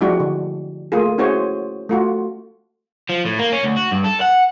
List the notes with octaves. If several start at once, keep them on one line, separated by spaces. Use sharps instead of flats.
F3 G#3 D4 E4 F#4 G4
D3
A3 A#3 F4 G#4
C#4 E4 F#4 G#4 C5 C#5
A3 F4 F#4
F3
A2
A#3
C#4
D2
F#4
G2
A4
F#5